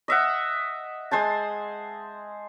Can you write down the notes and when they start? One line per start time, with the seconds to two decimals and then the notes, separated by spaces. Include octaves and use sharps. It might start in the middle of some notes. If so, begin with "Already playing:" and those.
0.08 D#5 E5 F#5
1.11 G#3 C5 G#5 A5